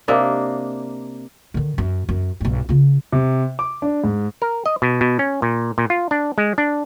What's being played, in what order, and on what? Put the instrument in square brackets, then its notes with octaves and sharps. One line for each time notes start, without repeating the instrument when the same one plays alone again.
[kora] C3 A#3 D4 D#4
[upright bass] D3 D#3
F#2
F#2
B1 G2
C#3 F4
[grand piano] C3
D6
D4
G#2
[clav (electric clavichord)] A#4
D#5
B2
B2
C#4
A#2
A#2
F4
D4
G#3
D4